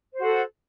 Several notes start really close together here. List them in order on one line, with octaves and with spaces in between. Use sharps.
C5 F#4 A4